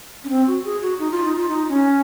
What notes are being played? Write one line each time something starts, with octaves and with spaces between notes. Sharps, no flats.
C#4
C4
F#4
G#4
F#4
D#4
F4
D#4
F4
D#4
C#4